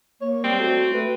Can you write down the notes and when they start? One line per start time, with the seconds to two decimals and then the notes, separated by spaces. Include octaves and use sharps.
0.21 A#3 C#5
0.44 G3 C4
0.59 A3 F#4
0.93 A3 B4